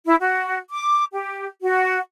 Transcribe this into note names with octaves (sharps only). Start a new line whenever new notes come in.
E4
F#4
D6
G4
F#4